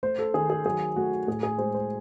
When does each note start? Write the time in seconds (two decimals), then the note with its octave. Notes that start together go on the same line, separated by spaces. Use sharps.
0.03 A3 C5
0.19 A4
0.34 D#3 G#4
0.50 G#4
0.65 F#3 G#4
0.96 A3 F#4
1.27 A2 G#4
1.43 G#4
1.58 G#3 C5
1.74 C5